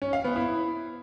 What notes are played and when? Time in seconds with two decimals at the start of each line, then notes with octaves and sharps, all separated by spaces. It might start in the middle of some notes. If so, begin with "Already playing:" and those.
0.02 C#4
0.13 F5
0.24 B3
0.36 E4